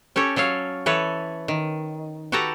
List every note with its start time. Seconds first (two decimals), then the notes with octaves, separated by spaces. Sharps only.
0.16 C#4 G4 A4 C#5
0.36 F#3 A4 C#5 F5
0.86 E3 A4 B4 C#5
1.48 D#3
2.32 F#4 G4 A4 B4 A5 A#5